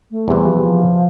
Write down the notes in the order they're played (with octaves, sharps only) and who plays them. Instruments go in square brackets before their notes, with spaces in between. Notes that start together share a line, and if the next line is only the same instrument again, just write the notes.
[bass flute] A3
[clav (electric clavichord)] E2 C3 E3 [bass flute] G3
[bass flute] F3
G3
F3